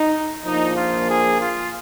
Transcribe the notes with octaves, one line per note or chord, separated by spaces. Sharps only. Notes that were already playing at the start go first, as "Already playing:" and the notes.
Already playing: D#4
A#1 A#2 F3 A#3 D#4
F4
G#4
F4